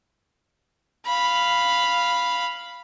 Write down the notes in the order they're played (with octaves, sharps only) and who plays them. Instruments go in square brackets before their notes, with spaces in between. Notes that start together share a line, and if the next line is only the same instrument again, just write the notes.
[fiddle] F5 B5